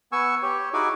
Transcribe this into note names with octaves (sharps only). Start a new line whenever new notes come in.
B3 G#5 C#6 E6
G4 C#5
D#4 E4 F#4 G#4 G#5 D6